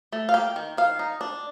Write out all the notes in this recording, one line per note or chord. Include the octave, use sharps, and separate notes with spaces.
A3
F5
A#3 G5
D#3
D#3 F5
D#4
D4